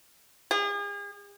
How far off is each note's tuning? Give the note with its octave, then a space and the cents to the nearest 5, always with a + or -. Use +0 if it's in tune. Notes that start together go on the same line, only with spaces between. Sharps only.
G#4 -40